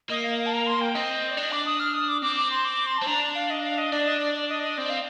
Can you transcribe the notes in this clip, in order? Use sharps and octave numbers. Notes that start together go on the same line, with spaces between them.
A#3 D#5
F5
F5
A5
A#5
C6
G5
C4 D#5
D5
D4 D#5
D6
D#6
F6
D#6
D6
C4 D6
D6
C6
D6
C6
C4 A5
D4 A#5
F5
D#5
F5
D#5
D4 D5
D#5
D5
D5
D#5
D#5
C4 D5
F5